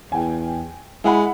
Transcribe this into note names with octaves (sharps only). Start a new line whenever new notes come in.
E2 G5 G#5
G#3 E4 F#5 B5